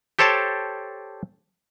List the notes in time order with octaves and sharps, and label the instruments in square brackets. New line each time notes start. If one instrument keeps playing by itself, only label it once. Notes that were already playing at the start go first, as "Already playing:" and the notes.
[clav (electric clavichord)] G4 A4 C5 C#5 G5 A5